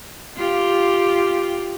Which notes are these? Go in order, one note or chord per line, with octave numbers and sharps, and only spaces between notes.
F4 G4